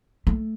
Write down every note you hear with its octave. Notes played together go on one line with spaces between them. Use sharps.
A3